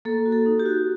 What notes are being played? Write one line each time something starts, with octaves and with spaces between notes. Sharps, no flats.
A#3 A4
F#4
A4
D#4
G4
F#4